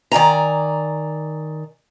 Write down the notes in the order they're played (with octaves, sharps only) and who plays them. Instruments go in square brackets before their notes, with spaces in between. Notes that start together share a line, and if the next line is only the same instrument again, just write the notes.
[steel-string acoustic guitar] D#3 D5 G#5 A#5